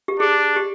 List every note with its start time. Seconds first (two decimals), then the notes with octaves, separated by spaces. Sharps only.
0.08 G4
0.19 D4 G#4
0.56 G4